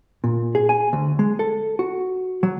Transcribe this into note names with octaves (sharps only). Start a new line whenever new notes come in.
A#2
G#4
G#5
D2
G#3
A4
F#4
F#3